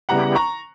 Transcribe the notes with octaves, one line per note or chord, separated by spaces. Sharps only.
C#3 G3 B3 E4 G4 F#5 A#5
A#5 C#6